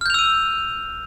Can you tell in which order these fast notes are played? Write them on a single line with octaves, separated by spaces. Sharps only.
F6 G6 F7 E6 D#7